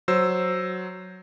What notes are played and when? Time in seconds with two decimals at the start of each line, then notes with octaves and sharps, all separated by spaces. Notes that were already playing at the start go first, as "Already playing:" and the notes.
0.08 F#3 C5 E6